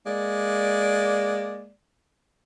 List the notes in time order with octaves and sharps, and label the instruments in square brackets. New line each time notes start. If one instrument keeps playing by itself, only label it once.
[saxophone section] G#3 A#3 D5